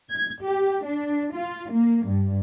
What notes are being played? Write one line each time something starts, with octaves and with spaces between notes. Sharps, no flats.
G#6
G4
D4
F4
A#3
G2